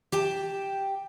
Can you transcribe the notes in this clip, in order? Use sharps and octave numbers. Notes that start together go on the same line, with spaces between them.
G4 G5 A5